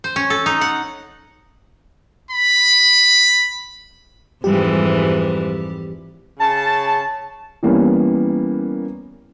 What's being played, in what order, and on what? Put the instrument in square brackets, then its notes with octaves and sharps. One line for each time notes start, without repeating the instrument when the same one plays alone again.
[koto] C5
C#4
A4
D#4
F#5
[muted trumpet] B5
[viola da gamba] F2 G#2 E3 [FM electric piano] G3 G4
[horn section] C#3 C#4 A5
[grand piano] E3 G3 A#3 B3 C#4